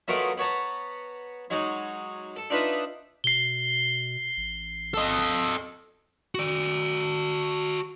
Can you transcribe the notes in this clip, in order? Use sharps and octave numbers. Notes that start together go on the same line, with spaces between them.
F#3 A3 B3 F4 A#4 D#5
B3 C#5 A5 A#5
F#3 G#3 D#4
A4
D4 D#4 F4 B4 D#5 E5
B2 C7 G7
A1
A4 D#5
F#4 D5